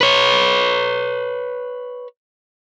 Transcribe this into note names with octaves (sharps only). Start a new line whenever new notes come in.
B4 C#5